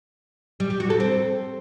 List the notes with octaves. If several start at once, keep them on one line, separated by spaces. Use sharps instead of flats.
G3
G4
F#4
A4
C4